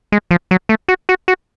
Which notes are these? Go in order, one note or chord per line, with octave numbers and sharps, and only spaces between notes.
G#3
F3
F#3
A3
F#4
F#4
F#4